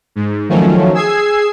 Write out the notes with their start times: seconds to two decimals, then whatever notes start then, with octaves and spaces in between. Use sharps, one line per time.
0.16 G#2
0.49 D#3 F3 F#3 A3 C#4
0.94 G#4 E6 G#6 C7